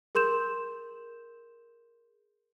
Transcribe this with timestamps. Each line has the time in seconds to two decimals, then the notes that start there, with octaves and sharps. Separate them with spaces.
0.15 G#4 A#4 C6 G6 E7